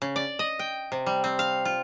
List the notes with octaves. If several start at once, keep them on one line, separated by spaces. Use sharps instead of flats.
C#3
D5
D#5
G5
C3
G3
C4
F5
F4